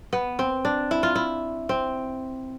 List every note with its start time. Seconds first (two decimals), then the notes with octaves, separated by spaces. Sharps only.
0.13 B3
0.39 C4
0.65 D4
0.91 E4
1.03 F4
1.15 E4
1.69 C4